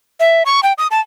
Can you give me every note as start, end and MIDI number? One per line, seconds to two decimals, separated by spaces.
0.20 0.43 76
0.46 0.60 85
0.63 0.73 79
0.78 0.87 87
0.91 1.01 81